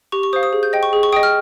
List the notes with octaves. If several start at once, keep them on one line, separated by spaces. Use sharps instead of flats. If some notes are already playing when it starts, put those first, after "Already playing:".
G4 C#6
C#6
C5 F5 D#6
D#6
G#4
G6
D#5 G5
C#6
G#4
C#6
D#5 G5 D#6
F6